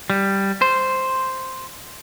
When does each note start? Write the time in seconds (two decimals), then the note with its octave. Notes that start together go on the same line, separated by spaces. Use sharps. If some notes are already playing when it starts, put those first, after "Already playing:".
0.10 G3
0.62 C5